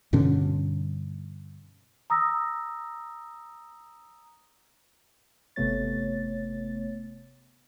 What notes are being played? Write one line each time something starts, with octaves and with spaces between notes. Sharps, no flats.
G2 B2 D3 C#4
A#5 D#6 E6 A#6
G1 C3 A3 B3 C#5 A6